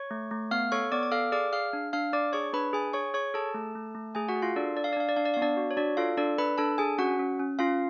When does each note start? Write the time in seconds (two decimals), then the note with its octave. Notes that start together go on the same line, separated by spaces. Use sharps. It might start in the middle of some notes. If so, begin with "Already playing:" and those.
Already playing: C#5 C#6
0.11 A3
0.31 A3
0.51 B3 F5 F6
0.72 A4 C#5 C#6
0.92 B3 D5 D6
1.03 D6
1.11 A4 F5 F6
1.32 G#4 D5 D6
1.52 G#4 F5 F6
1.73 D4
1.93 D4 F5 F6
2.13 D4 D5 D6
2.33 G#4 C#5 C#6
2.53 D4 B4 B5
2.73 G#4 G#5
2.93 G#4 C#5 C#6
3.14 G#4 C#5 C#6
3.34 G#4 A4 A5
3.54 A3
3.75 A3
3.95 A3
4.15 A3 G#4 G#5
4.28 F#4 F#5
4.35 G#4
4.42 F4 F5
4.56 D4 A4 D5
4.76 D4 D5
4.84 F5
4.93 D5
4.97 D4 F5
5.09 D5
5.16 D4 F5
5.25 D5
5.34 B3 F5
5.42 D4 D5
5.57 F#4
5.71 C#5
5.77 D4 F#4 D5
5.97 F4 A4 F5
6.17 D4 A4 D5
6.38 D4 B4 B5
6.58 D4 A4 A5
6.78 D4 G#4 G#5
6.98 C#4 F#4 F#5
7.19 C#4
7.39 C#4
7.59 C#4 F4 F5